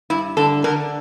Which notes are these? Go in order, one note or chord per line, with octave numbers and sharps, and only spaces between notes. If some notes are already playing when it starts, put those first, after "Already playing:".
G2 E4
D3 A4
D3 A#4